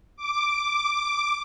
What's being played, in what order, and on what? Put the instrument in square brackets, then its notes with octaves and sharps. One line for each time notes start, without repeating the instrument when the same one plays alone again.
[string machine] D6